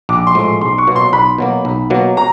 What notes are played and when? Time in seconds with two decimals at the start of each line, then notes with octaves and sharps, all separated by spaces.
0.09 A#1 D6
0.27 C6
0.35 A2 F3 G#3
0.44 C6
0.61 B1 C6
0.78 C#6
0.87 B2 F#3 A#3
0.96 C6
1.13 B1 B5
1.38 B2 F#3 A#3
1.65 B1
1.90 B2 F#3 A#3
2.17 A#5